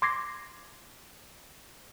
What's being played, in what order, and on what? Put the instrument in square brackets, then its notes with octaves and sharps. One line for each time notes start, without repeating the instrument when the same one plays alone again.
[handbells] C6 D6 G#6 A#6 C7